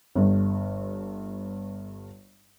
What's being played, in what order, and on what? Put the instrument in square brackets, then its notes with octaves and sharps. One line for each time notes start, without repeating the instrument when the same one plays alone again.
[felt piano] G1 G2